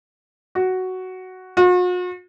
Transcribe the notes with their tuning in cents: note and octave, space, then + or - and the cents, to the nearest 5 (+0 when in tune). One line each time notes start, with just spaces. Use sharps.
F#4 +5
F#4 -45